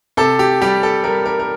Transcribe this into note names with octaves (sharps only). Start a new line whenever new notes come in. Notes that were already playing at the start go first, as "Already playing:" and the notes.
C3 A4
G4
G3 G4
A4
G3 A#4
A#4
A#4